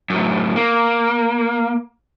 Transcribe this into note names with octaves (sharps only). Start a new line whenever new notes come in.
F#2 A2
A#3